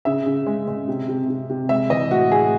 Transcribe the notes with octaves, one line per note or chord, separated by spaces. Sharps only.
C#3 E5
C#3
G#3
G#3
C3
C3
C3
C3
G#3 E5
E3 D#5
A2 F#4
A2 G#4